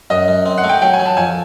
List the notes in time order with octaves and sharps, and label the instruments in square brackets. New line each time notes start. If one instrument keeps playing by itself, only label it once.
[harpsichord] F#2 [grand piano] D#5
[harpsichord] F#2
C4
[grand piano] F#5
[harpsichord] A3
[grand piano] G5
[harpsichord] F#3 [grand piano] G5
[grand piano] G#5
[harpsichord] F#3
[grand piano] A5
[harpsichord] F2 [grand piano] G#5